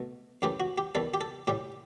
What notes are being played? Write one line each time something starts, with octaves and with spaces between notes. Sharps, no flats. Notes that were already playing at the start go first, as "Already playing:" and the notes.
Already playing: B2 A3
F#2 E3 A3 G4
F#4
G4
E2 D#3 G3 A4
G4
A4
A2 G3 G4